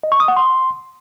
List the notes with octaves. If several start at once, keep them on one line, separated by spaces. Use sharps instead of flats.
D#5
C#6
D#6
F#5
C6